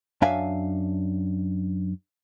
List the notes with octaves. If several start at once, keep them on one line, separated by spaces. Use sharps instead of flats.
F#2 D4 E5 F5 G#5